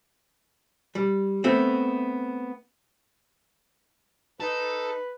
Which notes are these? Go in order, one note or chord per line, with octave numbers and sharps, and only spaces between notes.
G3
A3 B3 C4
D#4 A4 B4